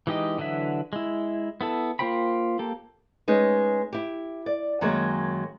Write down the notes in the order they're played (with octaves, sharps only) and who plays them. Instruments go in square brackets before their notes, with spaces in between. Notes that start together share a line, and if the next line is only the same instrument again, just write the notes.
[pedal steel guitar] E3 G#3 D#4 G4 D#5
D3 E3 F#3 E5
G#3 E4
B3 E4 A4
A#3 F4 C5 G5 B5
A#3 G4 A4
[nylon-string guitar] G#3 C#4 D#4 B4
E4 G4
D5
F#2 D#3 F#3 G#3 A#3